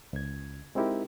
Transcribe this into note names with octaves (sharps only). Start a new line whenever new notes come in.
C#2 G#6
G#3 C4 D#4 E4 G4 A#4